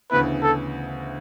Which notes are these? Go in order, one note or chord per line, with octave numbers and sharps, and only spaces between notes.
D2 C#3 E3 B3 E4 B4
A4